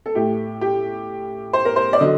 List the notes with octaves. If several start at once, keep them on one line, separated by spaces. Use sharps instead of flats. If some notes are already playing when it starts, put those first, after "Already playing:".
A4
A2 A3 G4
G4
C5
A#4
C5
D5
D3 F#3 D#5